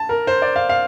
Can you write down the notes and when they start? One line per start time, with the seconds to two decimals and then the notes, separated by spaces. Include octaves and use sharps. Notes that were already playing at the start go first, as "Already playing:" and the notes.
Already playing: A5
0.09 A#4
0.27 C5
0.42 D5
0.56 F5
0.69 F5